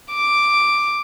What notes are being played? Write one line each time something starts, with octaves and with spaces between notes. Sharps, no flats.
D6